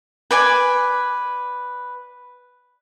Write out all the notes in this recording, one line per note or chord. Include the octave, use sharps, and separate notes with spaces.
B4 D5 G#5